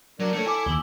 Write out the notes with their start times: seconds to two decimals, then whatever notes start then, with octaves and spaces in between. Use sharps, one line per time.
0.20 F#3 D4 A#4 D5
0.33 A3 A4 C#5
0.46 E4 G#5 D6
0.66 D#2 E6 F#7 G7